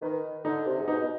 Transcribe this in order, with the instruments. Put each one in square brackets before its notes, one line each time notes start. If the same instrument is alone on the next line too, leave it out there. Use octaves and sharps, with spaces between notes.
[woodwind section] D#3 [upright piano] B4
[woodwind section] D3 [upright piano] D#4
[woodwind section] C3
G#2
[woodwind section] B2 [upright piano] D#4
[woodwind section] B2